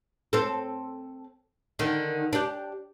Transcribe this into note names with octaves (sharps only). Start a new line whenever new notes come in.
C4 A4
D3 D#3
D4 G4